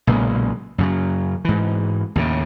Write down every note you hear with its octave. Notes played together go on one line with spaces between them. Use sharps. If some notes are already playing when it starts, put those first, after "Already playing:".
B1 A#2 C#3 G#3
F#2 C#3 F#3
G#2 E3
D#2 A2 C#3